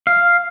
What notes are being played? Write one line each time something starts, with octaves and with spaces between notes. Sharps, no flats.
F5